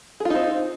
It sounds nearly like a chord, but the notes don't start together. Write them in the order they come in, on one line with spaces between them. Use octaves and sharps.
G#4 F4 D#4 C4